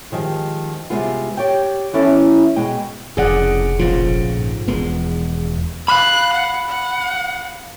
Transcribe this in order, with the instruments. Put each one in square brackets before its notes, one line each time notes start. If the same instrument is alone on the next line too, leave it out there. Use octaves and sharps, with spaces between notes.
[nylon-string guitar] D#3 F3 G#3 G4
C3 D#3 G3 G#3 B3 F4
G4 C#5 D5 G5
E3 B3 C#4 E4 A4 D5
B2 G#3 D#5 G5
[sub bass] F1 [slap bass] F2 A2 C#3 [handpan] G#4 D5 F#5
[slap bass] A#1 A2 C#3 [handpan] F3 F4
[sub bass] G#2
[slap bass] E1 G#3 [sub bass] E2 [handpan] B3
[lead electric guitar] F5 B5 [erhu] F#6
[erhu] F#5
F#5